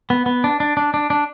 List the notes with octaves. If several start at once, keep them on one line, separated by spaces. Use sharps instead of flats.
B3
B3
D4
D4
D4
D4
D4